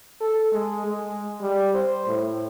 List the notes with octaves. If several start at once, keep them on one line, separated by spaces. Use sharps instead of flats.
A4
G#3
G#3
G3
C5
A2